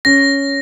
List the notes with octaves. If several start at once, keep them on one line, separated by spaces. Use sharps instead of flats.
C#4 A#6